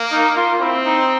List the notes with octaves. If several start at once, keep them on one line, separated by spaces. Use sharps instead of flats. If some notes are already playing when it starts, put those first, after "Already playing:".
Already playing: A#3
D#4
F4
C4 E4
D#4